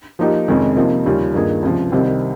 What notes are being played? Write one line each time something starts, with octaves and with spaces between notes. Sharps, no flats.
F3 A#3 D#4 G4
F2 C3 D#3 G#3 C#4
C3 F3 A#3 D#4
D#2 C#3 G3 C#4 F4
G2 D#3 A#3 F4 G#4
C#2 C3 F3
C2 C3 D#3 G3 C4